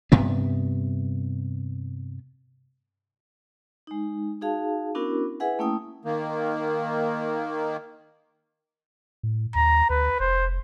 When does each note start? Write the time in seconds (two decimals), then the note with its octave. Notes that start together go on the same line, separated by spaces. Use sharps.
0.12 G2 C3 B3
3.87 G#3 D#4
4.41 D#4 F#4 G#4 F5 A5
4.95 B3 C#4 D4 E4 F#4 A#4
5.40 E4 G#4 B4 E5 F#5 G#5
5.59 A3 A#3 C#4 E4 G5 D#6
6.04 D#3 A#3
9.23 A2
9.55 D#2 A#5
9.90 D2 B4
10.20 F1 C5